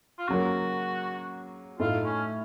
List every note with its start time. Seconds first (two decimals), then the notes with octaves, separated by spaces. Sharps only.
0.19 F4
0.28 C#3 F#3 A#3 F#4
1.79 A2 A3 D#4 F4
2.05 C#4